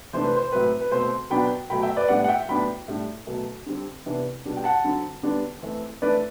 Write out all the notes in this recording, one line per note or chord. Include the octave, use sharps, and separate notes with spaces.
C3 E3 A3 D4 C5
B4
C5
A2 F#3 C4 B4
B4
B2 A3 C4 C5
B2 F#3 B3 D4 G5 B5
B2 F#3 A3 G5 B5
E5 G5
B4 D5
A2 G3 B3 D4 D5 F#5
F#5
E5 G5
A2 F#3 B3 D4 G5 B5
A2 G3 D4
B2 F#3 A3
D3 G3 C4
C3 E3 B3 D4
B2 G3 D4
G5
F#5 A5
D3 F#3 C4
D3 G3 B3 D4
E3 A3 C4
E3 A3 D4 B4 D5